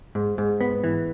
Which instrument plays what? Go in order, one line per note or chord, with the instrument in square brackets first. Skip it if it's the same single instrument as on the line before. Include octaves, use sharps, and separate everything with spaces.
[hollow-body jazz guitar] G#2
G#2
B3
E3